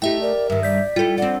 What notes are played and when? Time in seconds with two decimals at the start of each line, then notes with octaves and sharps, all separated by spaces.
0.02 A3 D#4 E4 G4 E5 G5
0.21 A#4 D5
0.50 G2 D#3 E5
0.63 D5 G6 B6
0.96 G3 E4 F4 A4 G5
1.18 C4 D4 D5 F#5